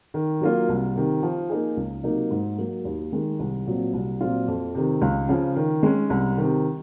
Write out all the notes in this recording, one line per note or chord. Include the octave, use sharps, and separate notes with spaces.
D#3
F#3 A#3 F4
C2
C3 D#3
F3
A#3 D#4 G#4
C#2
C3 F#3 A#3 D#4
G#2
F#3 A#3
D#2
D#3 G#3
C2
A#2 F#3 C4
C2
A#2 F#3 C4 F4
F2
C3 D#3
C#2
C#3 F3
D#3
G#3 C#4
C2
C3 D#3